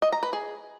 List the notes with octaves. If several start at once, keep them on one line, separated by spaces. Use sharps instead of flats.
D#5
A#5
B4
G#4